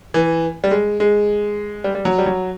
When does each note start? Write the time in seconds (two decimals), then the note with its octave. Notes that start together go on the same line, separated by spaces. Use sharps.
0.14 E3
0.64 G3
0.71 G#3
1.00 G#3
1.84 G3
1.95 G3
2.05 F#3
2.18 G3
2.26 F#3